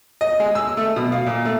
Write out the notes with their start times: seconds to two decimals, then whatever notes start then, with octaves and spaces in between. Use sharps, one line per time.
0.21 D#5
0.40 G#3
0.55 E6
0.77 A3
0.96 B2
1.12 F5
1.26 A#2
1.45 A3